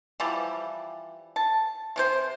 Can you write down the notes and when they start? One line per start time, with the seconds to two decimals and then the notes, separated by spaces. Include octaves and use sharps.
0.20 E3 F3 G3
1.36 A5
1.96 C3 D4 C5